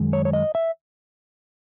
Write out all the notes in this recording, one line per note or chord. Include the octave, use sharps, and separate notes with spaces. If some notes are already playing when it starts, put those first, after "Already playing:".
Already playing: F#2 D#3 G#3
C#5
C#5
D#5
E5